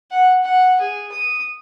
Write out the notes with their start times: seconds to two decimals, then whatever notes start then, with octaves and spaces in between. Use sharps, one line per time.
0.11 F#5
0.43 F#5
0.81 G#4
1.12 D#6